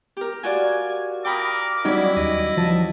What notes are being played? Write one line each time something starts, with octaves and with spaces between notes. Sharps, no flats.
G4 A#4
F4 F#4 D5 G#5
A#4 G5 B5 D6 D#6
F#3 G3 C#4 D#4 E4 D5
D#2 D#5
E3 F3 D#5 A5